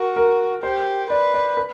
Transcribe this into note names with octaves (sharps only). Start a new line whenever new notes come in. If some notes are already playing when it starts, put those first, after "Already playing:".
Already playing: F#4 A#4
A#4
G4 C5
B4 D5
D5
B4